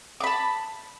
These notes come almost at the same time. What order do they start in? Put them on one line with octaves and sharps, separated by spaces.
D6 B5 A5